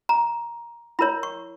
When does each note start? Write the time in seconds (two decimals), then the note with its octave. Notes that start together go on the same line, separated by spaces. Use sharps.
0.09 A#5
0.99 E4 A#4 C#5 B5
1.23 C#6